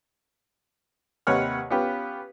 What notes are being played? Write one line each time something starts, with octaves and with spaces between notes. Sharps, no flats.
D#2 C3 B4 C#5 F#5 F6
B3 C#4 F4 G4 B4